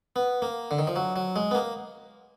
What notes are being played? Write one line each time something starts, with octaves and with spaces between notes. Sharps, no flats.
B3
A#3
D3
D#3
F3
F#3
F#3
G#3
B3
A#3